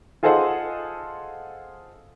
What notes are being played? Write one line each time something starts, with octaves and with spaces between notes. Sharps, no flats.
F4 G#4 A4 C5 D#5 F#5